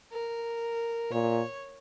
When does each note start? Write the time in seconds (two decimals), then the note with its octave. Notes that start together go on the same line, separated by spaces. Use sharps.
0.12 A#4
1.12 A#2 C#5